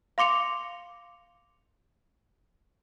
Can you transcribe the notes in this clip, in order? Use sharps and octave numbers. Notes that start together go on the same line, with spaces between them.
F5 C6 D6 C#7 F7